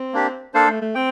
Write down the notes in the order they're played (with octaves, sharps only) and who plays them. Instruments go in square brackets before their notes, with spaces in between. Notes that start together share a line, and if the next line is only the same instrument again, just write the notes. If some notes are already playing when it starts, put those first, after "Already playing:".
Already playing: [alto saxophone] C4
[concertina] A#3 D4 G4
[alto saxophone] A#3 [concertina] D4 A4 C5 F5
[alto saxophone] A3
A3
[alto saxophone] C4 [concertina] G5